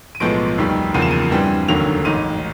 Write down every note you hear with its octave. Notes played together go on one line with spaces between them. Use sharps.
D#7
B1 A2 F3 G#3 B3 D7
F1 D#2 D#3 G3
F#1 E2 C#3 F3 A#3 D#7
E7
D#7
G2 E3 G3 C4
F1 D#2 D3 F#3 A#3 F7
A1 G#2 D#3 D#7